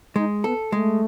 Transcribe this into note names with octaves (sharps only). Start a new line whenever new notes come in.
G#3 D#4
B3 A4
G#3 A3